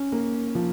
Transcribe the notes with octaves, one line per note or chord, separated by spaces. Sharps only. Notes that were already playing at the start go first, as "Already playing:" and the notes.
Already playing: C#4
A#3
F3